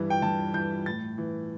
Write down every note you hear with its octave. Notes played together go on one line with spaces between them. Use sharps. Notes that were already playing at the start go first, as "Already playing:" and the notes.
Already playing: G2 E3
G5
G2 A5
E3 G6
A2 A6
E3